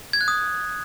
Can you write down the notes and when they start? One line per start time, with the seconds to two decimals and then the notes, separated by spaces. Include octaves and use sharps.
0.13 G#6
0.21 F#6
0.28 D#6